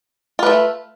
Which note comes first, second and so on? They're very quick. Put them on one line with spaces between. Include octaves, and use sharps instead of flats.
F4 B4 A3